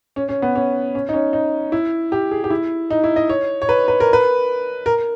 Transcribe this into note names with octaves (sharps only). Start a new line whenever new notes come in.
C#4
C#4
B3
C#4
C#4
D#4
C#4
D#4
E4
G4
G#4
G4
E4
D#4
E4
D#5
C#5
C#5
B4
B4
A#4
B4
A#4